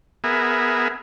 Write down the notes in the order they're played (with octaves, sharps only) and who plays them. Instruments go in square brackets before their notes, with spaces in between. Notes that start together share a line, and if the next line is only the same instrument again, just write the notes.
[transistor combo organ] B3 G#4 A#4 E5